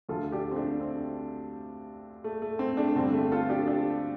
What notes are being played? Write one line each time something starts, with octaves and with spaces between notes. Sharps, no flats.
D2 D3 F3 F4 A4
D4 G4
C4
A3 D4
C4
A3
A3
C4
A3 D4
G1 G2 D3 C4
A3
F4 A4
D4 G4
D4 G4